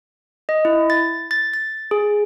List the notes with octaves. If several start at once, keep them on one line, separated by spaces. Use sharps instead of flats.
D#5
E4
A6
A6
A6
G#4